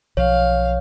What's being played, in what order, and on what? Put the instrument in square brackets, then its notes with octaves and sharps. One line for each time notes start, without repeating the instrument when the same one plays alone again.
[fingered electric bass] B1 F3 [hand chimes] C#5 [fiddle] F5